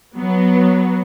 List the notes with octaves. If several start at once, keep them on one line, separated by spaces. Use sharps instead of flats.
F#3 B3